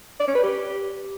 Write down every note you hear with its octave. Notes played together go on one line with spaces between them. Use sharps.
D5
C#4
B4
G4